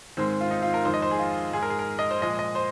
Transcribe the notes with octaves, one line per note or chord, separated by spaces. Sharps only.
G#2 D#3 G#3 C4
F4
D#4
F4
A#4
F2 D#3 G#3 C5
D#5
C5
G#4
F4
G#2 G#3 G#4
A#4
G#4
A#4
D#5
C5
A#2 F3 G#3 D#5
D#5
C5